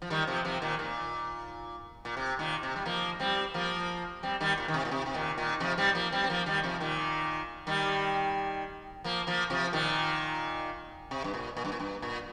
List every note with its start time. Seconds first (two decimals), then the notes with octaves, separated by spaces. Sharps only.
0.02 F3
0.10 D#3 G3
0.27 C3 F3
0.45 C3 F3
0.62 A#2 D#3
0.79 A#2
2.05 A#2
2.17 C3
2.39 A#2 D#3
2.63 C3
2.76 G3
2.85 F3 A#3
3.20 G3 C4
3.54 F3 A#3
4.23 G3 C4
4.40 D#3 G3
4.58 A#2
4.68 D#3
4.74 C3
4.85 A#2
4.91 C3
5.06 C3
5.14 A#2 D#3
5.38 A#2 D#3
5.60 C3 F3
5.78 G3 C4
5.95 F3 A#3
6.12 G3 C4
6.24 C4
6.29 F3 A#3
6.46 D#3 G3
6.64 C3 F3
6.80 A#2 D#3
7.67 D#3 G3
9.04 F3 A#3
9.27 F3 A#3
9.50 C3 F3
9.73 A#2 D#3
11.11 C3
11.24 G2
11.34 A#2
11.57 A#2
11.65 G2
11.72 A#2
11.80 G2
12.02 A#2